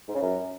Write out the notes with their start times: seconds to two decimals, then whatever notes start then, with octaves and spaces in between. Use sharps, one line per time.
0.09 G#2
0.15 C#3
0.21 F#2